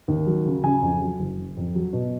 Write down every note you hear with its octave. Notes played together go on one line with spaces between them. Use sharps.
D#2
F#3
C#3
C#3 G#5
F2
F#3
F#1
C#3
F2
F#3
B2